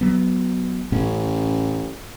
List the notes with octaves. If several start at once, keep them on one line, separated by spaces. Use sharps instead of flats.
F#3 B3
A1 A2 C#4